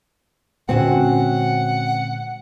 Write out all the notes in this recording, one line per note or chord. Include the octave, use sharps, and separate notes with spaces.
A#2 D3 G#3 C4 C#4 F#4 F#5